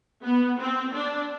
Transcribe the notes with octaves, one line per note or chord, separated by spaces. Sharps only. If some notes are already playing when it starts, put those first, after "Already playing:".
B3
C4
D4